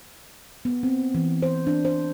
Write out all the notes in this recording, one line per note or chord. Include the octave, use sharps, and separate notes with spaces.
B3
C4
E3
C5
D4
C5